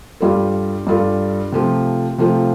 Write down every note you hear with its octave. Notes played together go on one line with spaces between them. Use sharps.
G2 G3 F4 A4
G2 G3 F4 A4
C3 F3 A3 F4
C3 F3 A3 F4